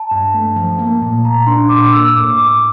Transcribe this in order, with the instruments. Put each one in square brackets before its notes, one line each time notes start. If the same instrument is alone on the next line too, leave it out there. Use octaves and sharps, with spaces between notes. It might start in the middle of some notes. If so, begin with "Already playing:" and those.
Already playing: [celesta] A5
[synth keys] G2
A3
F3
A#3
A#2
[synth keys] A#2 [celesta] A#5
[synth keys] D4 [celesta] C6
[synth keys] A#2 [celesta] D6
[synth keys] A#3 [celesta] E6
[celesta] E6
[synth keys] A2 [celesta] D6
[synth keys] A2 [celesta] D6